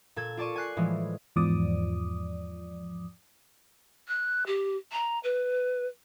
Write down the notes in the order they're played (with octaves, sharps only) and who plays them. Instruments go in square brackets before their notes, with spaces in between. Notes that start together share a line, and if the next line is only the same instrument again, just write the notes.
[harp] A#2 A4 G#6
F4 D5 A5 C#6 D#7
G#5 F#6 C7
A2 E3 F3 G#3
[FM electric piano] E2 G#2 F3 D5 D6 D#6
[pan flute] F#6
G4
A#5
B4